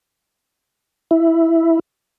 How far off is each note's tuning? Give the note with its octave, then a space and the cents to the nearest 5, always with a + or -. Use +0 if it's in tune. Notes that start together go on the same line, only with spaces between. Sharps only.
E4 +0